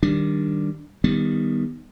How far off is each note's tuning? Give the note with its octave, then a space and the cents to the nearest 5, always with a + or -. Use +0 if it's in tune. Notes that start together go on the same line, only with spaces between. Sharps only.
D#3 +0 G3 +0 D4 +0
D#3 +5 G3 +10 B3 +0